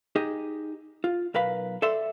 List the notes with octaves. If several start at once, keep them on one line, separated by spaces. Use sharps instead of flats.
D#4 G4 G#4 D#5
F4
B1 A#4 B4 F5 B5
A4 D5 E5 C6